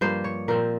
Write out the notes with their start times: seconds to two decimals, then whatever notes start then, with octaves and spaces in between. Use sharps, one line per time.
0.01 G2 F3 A#3 C5
0.24 C#5
0.48 A#2 F3 C4 A#4